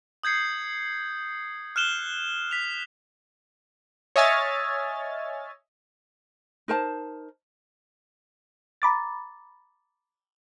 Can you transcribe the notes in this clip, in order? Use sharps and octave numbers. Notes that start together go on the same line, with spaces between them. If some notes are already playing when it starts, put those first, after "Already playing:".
D#6 G6 G#6 C7 C#7
F6 F#6 E7 G7
B6 F7
C#5 D#5 E5 G#5 F6 A6
D#4 A#4 C5 A5
A#5 B5 D6 A6